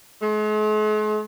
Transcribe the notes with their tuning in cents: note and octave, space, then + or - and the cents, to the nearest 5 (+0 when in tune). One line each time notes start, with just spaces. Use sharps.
G#3 +45